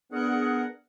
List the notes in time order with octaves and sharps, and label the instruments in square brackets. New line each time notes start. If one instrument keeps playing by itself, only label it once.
[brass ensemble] B3 [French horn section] D4 [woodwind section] G#4 A#4 F#5